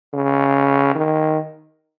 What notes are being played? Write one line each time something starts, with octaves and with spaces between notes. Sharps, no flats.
C#3
D#3